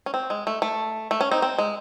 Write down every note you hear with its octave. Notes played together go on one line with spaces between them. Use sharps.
C#4
C4
G#3
A3
A3
A3
C#4
C4 D#4
C4
G#3